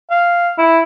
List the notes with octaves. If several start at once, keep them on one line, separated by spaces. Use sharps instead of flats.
F5
E4